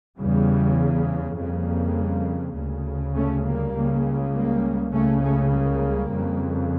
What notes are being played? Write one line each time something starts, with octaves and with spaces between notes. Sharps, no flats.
E2 C#3 E3 G3
F2 C#3 G3 A#3
D2 C#3
A3 C#4
G3 A#3
C#2 C#3
G3 A#3
C#2 C#3 A3 C#4
A3 C#4
G3 A#3
F2 C#3